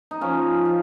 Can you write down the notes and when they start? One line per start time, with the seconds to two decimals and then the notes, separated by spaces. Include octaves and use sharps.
0.11 D#4
0.21 F3 C#4
0.65 F3